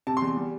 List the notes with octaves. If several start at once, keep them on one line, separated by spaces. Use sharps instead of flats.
C3 A5
C6
E2
G3